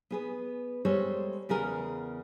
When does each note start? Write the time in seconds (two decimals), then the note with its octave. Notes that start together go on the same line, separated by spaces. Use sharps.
0.11 B3 G#4 B4
0.85 G3 G#3 A4 C5 C#5
1.49 E2 C#3 B3 G#4 A#4